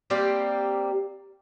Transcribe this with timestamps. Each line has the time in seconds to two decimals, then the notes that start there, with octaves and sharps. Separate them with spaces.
0.10 G3 A#3 C4 G4